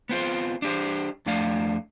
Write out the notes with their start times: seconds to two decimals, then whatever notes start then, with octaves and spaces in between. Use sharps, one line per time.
0.09 B3 C4 F4 C5
0.62 D4 G4 C5
1.26 F2 A3 D4 D5 F5